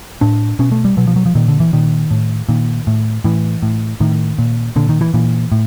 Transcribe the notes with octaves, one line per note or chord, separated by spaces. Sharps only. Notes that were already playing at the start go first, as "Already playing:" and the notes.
A2 D4
B2 C#4
A3
G3
B2 F#3
F3
F#3
F3
A#2 D#3
D3
E3
A#2 D#3
A2
A#2 D#3
A2
A2 E3
A2
A2 D#3
A#2
A#2 D3
D#3
E3
A#2 E3
A2